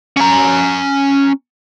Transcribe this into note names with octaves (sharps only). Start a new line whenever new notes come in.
C#4 A#5